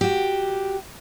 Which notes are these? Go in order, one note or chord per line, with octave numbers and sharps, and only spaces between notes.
F#4 G4